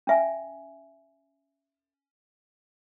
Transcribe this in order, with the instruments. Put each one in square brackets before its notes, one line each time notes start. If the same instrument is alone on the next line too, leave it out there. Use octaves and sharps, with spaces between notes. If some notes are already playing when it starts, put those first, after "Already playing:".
[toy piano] C#4 E5 G#5